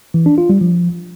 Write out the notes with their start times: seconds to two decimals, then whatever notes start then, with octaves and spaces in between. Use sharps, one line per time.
0.14 E3
0.26 D4
0.38 F4
0.50 G3
0.61 F3